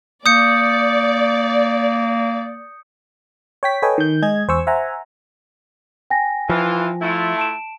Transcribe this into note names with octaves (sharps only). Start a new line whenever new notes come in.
A#3 D5 D#6 G6 C#7
C#5 G5 B6
A4 B4 C#5 D#5 G5 G#5
D#3 G6
G#3 G#4 D#5 G#6
E2 C5 G#5 C#6 E6
C5 E5 F#5 G#5 A#5
G5 G#5 A#6
E3 F3 F4
A3 E4 F4
A5 D7 E7